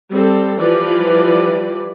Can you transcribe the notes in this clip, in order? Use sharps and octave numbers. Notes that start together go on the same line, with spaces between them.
G3 C4 A4
E3 F3 G3 B4 D5